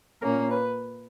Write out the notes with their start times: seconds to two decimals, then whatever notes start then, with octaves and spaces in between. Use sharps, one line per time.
0.22 A#2 A#3 C#4 A#4
0.51 B4